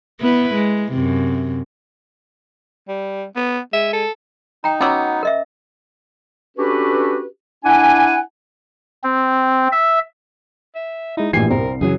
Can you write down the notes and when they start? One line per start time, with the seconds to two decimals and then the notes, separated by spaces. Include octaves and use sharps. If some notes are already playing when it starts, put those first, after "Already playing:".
0.20 B3 E4 B4
0.55 G#3
0.92 F#2 C3
2.88 G3
3.36 B3
3.73 G#3 E5
3.93 A4
4.64 D#4 G5 A#5
4.81 F#3 B3 C#4 D6 E6
5.23 A#4 D#5 E5
6.57 C#4 D4 F#4 G4 A4 B4
7.65 D4 E4 F#5 G#5
9.03 C4
9.72 E5
10.75 E5
11.17 G#3 D#4 E4
11.33 A#1 A2 E3 G4 G#5 C7
11.51 C2 C4 A#4
11.81 F#2 C#3 E3 F#3 G#4